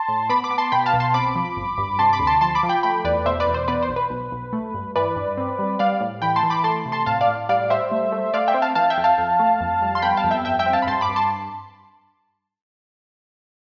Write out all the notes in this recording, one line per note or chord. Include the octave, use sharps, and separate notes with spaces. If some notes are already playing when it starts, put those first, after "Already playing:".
Already playing: A5 C6
A2
B3 B5 D6
B5 D6
B3
A5 C6
B2 G5 B5
F5 A5
B1
A5 C6
C4 B5 D6
F3
G1
G2
C3 A5 C6
B5 D6
D2
A5 C6
F3 A5 C6
B5 D6
F3
G5 B5
A3 G5 B5
E2 B4 D5
B2 C5 E5
B4 D5
E2
C5
B3 B4 D5
C5
B1
B4
B1
B1
A3
G2
E3 B4 D5
G2
C4
G3
G3 D5 F5
A2
E3 G5 B5
A5 C6
E3
B5 D6
A3 A5 C6
C3
A5 C6
A2 F5 A5
D5 F5
A2
G3 D5 F5
G3 C5 E5
A3
A3
A3 D5 F5
E5 G5
C4
F5 A5
E3 F5 A5
E5 G5
F2
F5 A5
F2
A3
F2
G3
C6
B3 G5 B5
F5 A5
F2
E5 G5
G2 E5 G5
E5 G5
C4
F5 A5
B5
G2 A5 C6
B5 D6
G2
A5 C6